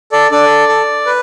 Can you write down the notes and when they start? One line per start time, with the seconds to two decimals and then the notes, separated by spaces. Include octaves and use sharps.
0.12 A4 D5
0.31 D4 A4 D5
0.69 A4
1.06 B4